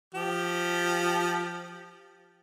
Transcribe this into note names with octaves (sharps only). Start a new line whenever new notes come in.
F3 G4